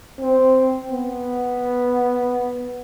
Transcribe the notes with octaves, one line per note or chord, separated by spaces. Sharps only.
C4
B3